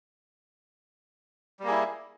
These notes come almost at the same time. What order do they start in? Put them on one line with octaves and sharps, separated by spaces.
G3 A#3 G#4 E4